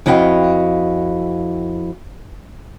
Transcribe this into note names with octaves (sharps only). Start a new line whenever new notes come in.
F2 E4 F#4 D#5 F5 G5